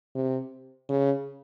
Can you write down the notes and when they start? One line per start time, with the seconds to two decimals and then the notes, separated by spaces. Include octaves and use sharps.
0.15 C3
0.89 C#3